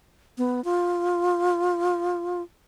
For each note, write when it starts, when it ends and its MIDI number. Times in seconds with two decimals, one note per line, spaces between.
0.38 0.63 59
0.64 2.42 65